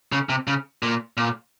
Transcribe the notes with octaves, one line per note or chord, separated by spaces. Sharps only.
C#3
C3
C#3
A#2
A#2